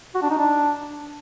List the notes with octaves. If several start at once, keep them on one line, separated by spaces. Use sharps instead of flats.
F#4
D4
D#4
D4